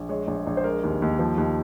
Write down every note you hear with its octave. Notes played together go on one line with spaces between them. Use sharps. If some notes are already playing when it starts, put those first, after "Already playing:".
Already playing: A#1
G#3 C#5
A#1
A#1
C5
G#3 A#4
D#2
D#2
F3
D#2